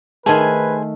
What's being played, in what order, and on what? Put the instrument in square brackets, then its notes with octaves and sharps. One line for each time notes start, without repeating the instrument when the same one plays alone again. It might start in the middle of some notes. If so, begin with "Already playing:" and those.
[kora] D#3 A3 [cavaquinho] G#4 C5 G#5 [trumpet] B4 [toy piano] A5